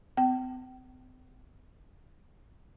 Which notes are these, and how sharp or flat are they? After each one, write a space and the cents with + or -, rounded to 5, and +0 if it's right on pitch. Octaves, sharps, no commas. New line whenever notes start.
C4 -45 G5 -35